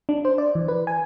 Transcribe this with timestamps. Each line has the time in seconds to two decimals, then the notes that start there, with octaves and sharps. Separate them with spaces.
0.09 D4
0.25 C5
0.38 D5
0.55 E3
0.68 B4
0.87 G#5